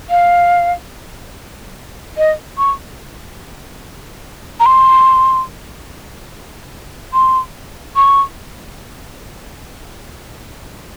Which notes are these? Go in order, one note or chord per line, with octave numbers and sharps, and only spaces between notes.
F5
D#5
C#6
A#5
C6
C6
C#6